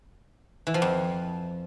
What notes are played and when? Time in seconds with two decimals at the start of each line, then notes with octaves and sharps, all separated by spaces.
0.67 E3
0.74 F3
0.82 F2